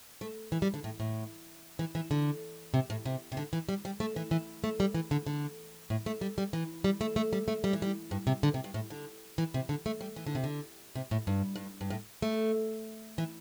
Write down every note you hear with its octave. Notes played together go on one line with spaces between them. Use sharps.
A3
E3
G3
D3
A2
A2
E3
E3
D3
C3
A2
C3
C3
D3
E3
G3
G3
A3
E3
E3
A3
G3
E3
D3
D3
A2
A3
G3
G3
E3
G3
A3
A3
G3
A3
G3
E3
G3
G2
C3
D3
C3
G2
A2
D3
E3
C3
D3
A3
G3
E3
D3
C3
D3
C3
A2
G2
G2
G2
A2
A3
E3